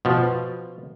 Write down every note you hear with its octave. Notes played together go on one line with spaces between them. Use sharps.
B2 F3